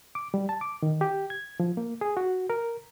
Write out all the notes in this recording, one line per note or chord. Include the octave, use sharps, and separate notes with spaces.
D6
G3
A5
D6
D#3
G4
G#6
F3
A#3
G#4
F#4
A#4